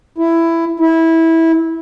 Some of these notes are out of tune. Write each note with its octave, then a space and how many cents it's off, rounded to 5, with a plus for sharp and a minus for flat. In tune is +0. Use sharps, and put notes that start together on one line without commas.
E4 +10
E4 -15